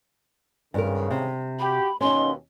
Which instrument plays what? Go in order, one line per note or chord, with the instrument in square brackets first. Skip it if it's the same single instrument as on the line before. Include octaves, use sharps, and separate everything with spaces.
[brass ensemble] G#1 C#3 [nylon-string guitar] G2 A#4
[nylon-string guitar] C3
[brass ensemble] F#4 G4 [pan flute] B5
[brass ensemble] D#2 B2 [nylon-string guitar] C#4 D#4 [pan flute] C6